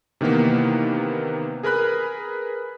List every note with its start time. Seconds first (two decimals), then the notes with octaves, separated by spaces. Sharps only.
0.21 C3 D#3 E3 A#3 B3
1.63 G#4 A#4 B4 B5 F#6